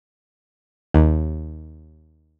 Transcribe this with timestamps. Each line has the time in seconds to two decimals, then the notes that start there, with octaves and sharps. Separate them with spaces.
0.94 D#2